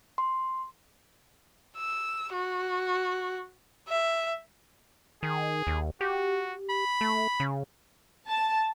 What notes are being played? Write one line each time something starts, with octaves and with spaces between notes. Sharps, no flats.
C6
E6
F#4
E5
D#3 G#4
D#2
F#4 G4
B5
A3
C#3
A5